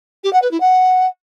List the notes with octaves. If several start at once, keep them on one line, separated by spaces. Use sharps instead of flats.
G4
F#5
B4
E4
F#5